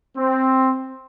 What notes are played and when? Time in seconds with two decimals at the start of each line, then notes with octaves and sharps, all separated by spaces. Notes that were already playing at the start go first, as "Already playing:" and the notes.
0.17 C4